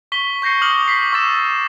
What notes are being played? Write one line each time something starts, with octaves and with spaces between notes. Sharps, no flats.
C#6 B6 G7
C#6 G6 A#6 C7 C#7
D6 D#6 F6 F#7
B6 C7
C#6 E6 A6 E7